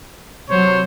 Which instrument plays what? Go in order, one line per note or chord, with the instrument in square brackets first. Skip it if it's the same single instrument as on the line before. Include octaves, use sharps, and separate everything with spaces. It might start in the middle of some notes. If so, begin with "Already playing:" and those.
[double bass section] C3 F#3 [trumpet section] C5 C#5